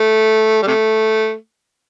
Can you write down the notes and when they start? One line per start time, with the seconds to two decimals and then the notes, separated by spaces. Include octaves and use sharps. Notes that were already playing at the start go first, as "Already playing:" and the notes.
Already playing: A3
0.62 G3
0.67 C3 A3